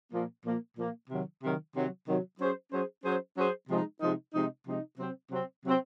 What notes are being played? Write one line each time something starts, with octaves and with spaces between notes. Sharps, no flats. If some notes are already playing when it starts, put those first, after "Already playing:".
A#2 F3 A#3
A#2 F3 A#3
A#2 F3 A#3
C3 D#3 F#3
C3 D#3 F#3
C3 D#3 F#3
C3 D#3 F#3
F#3 C#4 G#4 C5
F#3 C#4 G#4 C5
F#3 C#4 G#4 C5
F#3 C#4 G#4 C5
C3 F3 G#3 D#4
C3 F3 G#3 D#4
C3 F3 G#3 D#4
C3 F3 G#3 D#4
C3 F#3 C4
C3 F#3 C4
C3 F#3 C4